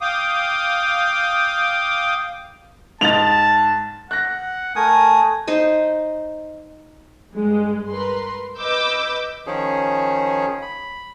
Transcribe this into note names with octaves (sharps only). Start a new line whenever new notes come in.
F5 G5 D6 D#6
G#2 D#5 A5 A6 F7 F#7
F#5 F#6 A#6
A3 A#4 G#5 D#6
D#4 C5 D#5
G2 G#3
A#4 B4 C6
B4 D#5 D6 E6 G6
D#3 F3 C#4 G#4
B5